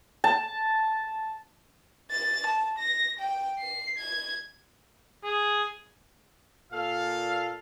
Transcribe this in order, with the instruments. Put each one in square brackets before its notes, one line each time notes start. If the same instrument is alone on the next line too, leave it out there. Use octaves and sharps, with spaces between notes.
[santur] A5
[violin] A6
A5
A#6
G5
C7
G#6
[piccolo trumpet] G#4
[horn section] A#2 A4 F5